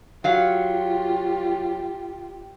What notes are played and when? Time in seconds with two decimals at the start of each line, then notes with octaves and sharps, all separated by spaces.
0.24 F#3 F4 G4 F5 F#5